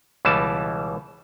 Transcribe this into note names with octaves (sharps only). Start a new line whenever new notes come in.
C#2 B2 E3 G3 A5